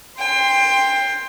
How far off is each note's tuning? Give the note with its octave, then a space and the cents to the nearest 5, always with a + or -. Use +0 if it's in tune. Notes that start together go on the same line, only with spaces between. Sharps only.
G5 +25 C6 +0